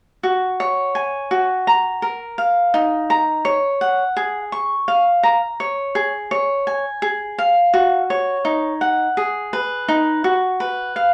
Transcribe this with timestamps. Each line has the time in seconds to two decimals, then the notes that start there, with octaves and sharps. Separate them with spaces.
0.23 F#4
0.60 C#5
0.95 G#5
1.31 F#4
1.67 A#5
2.02 A#4
2.38 F5
2.74 D#4
3.10 A#5
3.45 C#5
3.81 F#5
4.17 G#4
4.52 C#6
4.88 F5
5.23 A#5
5.60 C#5
5.95 G#4
6.31 C#5
6.67 G#5
7.02 G#4
7.38 F5
7.74 F#4
8.10 C#5
8.45 D#4
8.81 F#5
9.17 G#4
9.53 B4
9.88 D#4
10.24 F#4
10.60 B4
10.96 F5